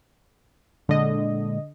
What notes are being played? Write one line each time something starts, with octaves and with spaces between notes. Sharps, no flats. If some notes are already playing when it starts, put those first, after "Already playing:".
A#2 D3 G#3 D#5